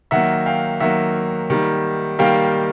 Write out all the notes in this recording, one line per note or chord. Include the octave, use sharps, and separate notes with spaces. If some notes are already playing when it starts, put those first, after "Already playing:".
D#3 F#3 A#3 E5 F#5
F5 G5
D#3 F#3 A#3 E5 F#5
D#3 G3 A#3
D#3 G3 A#3 F5 G5